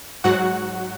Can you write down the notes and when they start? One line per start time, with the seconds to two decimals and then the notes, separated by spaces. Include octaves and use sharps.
0.24 G#2 F#3 F#4 F#5